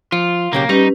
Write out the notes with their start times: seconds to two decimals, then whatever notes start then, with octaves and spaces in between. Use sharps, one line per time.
0.12 F3 F4
0.53 B1 C#3 A#3 G4
0.69 G3 C#4 D#4 G4 B4